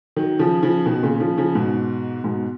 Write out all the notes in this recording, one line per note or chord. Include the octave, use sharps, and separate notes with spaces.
D#3 F#3
C#3 F3
C#3 F3
B2 D#3
A#2 C#3
C#3 F3
C#3 F3
G#2 B2
G#2 B2